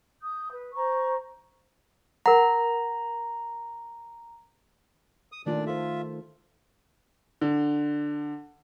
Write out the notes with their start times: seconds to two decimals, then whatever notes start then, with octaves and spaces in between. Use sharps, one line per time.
0.21 D#6 G6
0.51 B4
0.73 C5 A#5 C#6
2.26 A#4 F#5 A#5
5.32 D#6
5.46 A#2 D#3 A3 D4 F4 D5
5.67 F4 A4 C5 E5
7.41 D3